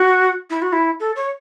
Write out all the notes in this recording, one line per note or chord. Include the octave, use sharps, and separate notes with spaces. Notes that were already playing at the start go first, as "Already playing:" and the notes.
Already playing: F#4
E4
F#4
E4
A4
C#5